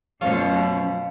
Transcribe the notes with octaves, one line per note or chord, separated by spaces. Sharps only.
F#2 B2 F3 A3 C#4 F4 C#5 F5